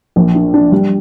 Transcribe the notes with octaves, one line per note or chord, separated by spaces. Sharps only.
A#1
D4
D4
G3